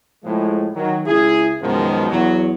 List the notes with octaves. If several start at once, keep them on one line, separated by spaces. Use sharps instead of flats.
A2 F3 G#3
D#3 F#3
C#2 E4 G#4
F#2 B2 D#3 F3 G#3
E2 F#3